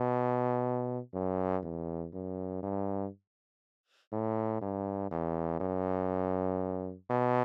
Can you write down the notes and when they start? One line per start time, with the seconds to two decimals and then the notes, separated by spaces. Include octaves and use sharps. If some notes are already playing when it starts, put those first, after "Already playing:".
Already playing: B2
1.14 F#2
1.63 E2
2.13 F#2
2.63 G2
4.12 A2
4.61 G2
5.11 E2
5.60 F#2
7.10 B2